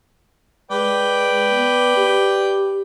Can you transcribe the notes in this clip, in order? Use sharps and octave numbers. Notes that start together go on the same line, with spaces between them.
G#3 B4 D5 G5
B3
G4